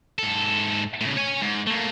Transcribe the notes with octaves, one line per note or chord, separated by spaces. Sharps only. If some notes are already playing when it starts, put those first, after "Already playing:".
G#2 A4
A2 C#3
C#5 G#5
G#2
A3 A#3